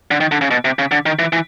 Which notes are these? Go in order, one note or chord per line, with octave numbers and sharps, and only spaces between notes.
D3
D#3
D3
C#3
B2
C3
C#3
D3
D#3
E3
E3